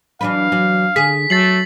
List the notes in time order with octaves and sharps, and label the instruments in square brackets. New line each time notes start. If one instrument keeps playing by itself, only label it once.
[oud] E3 D4 B4 [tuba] F#3 [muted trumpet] F5
[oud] E3 [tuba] F#3
[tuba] D3 [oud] G#4 [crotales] B6
[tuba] F#3 [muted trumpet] A3 [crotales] A6 C7 F#7